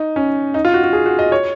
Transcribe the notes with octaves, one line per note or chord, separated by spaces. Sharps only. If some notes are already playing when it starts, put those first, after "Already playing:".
Already playing: D#4
C#4
D#4
F4
F#4
F#4
G#4
F#4
D#5
C#5